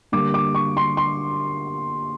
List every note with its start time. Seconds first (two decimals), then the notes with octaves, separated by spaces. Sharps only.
0.12 D3 G3 A#3 D6
0.34 D6
0.55 C#6
0.77 C6
0.97 C6